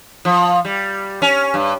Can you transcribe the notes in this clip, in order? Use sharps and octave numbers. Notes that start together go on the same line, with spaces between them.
F3
G3
C#4
G2